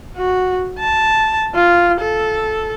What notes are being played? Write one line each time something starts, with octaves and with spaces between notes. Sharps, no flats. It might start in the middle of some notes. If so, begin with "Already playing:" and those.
F#4
A5
F4
A4